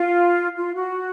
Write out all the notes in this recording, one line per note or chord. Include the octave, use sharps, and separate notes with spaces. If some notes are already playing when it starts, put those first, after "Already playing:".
Already playing: F4
F4
F#4